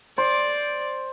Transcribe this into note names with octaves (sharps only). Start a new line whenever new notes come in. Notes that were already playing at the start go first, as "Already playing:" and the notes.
C5 D5